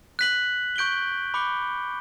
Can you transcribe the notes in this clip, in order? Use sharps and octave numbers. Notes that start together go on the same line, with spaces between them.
F#6 B6 F#7
C#6 G6 D7 G7
B5 D6 F#6 C#7 G7